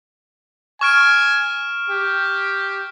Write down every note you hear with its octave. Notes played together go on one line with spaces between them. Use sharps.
G#5 C#6 F6 D7
G4